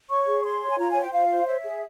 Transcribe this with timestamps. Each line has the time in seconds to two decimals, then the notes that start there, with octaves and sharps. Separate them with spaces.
0.10 C#5 C#6
0.27 G#4
0.44 C#5 C6
0.61 C#5
0.70 G#5
0.78 F4 A#5
0.90 G#5
0.96 C5
1.01 G5
1.13 F4 F5
1.30 C5
1.47 C#5 E5
1.65 G#4